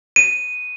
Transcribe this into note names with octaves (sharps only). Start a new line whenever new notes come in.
D#7